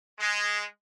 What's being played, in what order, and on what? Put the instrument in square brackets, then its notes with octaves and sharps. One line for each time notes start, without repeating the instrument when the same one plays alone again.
[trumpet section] G#3